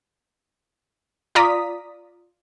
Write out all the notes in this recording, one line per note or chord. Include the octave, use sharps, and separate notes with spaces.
F4 D5 A#5 D#6 B6